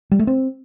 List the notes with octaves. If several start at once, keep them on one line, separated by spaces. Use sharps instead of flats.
G3
A3
C4